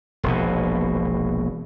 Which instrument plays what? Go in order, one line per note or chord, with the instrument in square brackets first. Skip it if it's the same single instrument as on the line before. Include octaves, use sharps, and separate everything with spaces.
[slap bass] E1 A#1 B2